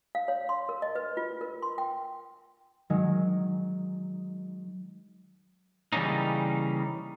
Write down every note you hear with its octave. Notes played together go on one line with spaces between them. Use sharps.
F5
C#5
C6
A#4
D#5
B4
F4
A#4
C6
G5
D#3 F#3 G#3
C#3 E3 G3 A#3 C#4 D#4